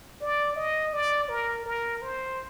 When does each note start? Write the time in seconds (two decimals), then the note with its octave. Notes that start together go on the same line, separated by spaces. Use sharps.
0.21 D5
0.56 D#5
0.93 D5
1.29 A#4
1.66 A#4
2.02 C5